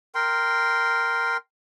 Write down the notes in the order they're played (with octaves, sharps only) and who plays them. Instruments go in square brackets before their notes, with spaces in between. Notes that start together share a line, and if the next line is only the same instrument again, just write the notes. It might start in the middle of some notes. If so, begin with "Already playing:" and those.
[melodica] A#4 G5 C6